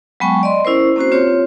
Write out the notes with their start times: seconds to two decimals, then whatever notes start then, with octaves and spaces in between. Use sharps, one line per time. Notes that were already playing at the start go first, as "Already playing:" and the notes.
0.20 F#3 G#3 B3 G5 A5 C#6
0.43 D5 D#5 C6
0.65 C#4 E4 A#4 C5
0.96 A#3 C4 C#4 F#4 C5
1.12 C4 F4 G4 C#5